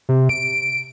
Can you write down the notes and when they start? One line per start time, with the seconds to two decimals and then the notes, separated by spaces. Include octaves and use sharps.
0.09 C3
0.29 D7